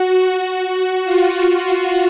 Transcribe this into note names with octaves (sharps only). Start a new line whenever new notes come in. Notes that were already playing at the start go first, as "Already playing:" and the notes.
Already playing: F#4
F4